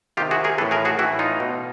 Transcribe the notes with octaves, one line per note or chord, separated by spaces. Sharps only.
C3 D#3 F4 G4
F#4 G#4
G#4 A#4
A2 E3 A4 B4
G#4 A#4
F#4 G#4
A2 E3 E4 F#4
D#4 F4
B2